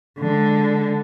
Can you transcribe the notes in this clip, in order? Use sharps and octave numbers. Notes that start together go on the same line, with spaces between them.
D3 G#3